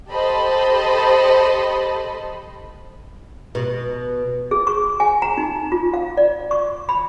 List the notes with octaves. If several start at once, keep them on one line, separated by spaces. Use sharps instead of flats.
G4 A4 C5 D#5 A5 B5
B2
G#4
C#6
G#5
A#5
D#4
F4
F5
D5
C#6
B5